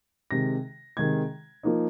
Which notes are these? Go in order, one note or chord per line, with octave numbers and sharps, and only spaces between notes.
C3 D#3 G#3 A#6
C3 D#3 G#3 G#6
F3 A#3 D#4